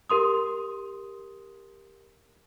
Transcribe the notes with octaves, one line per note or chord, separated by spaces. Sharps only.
G4 A#4 C6 D#6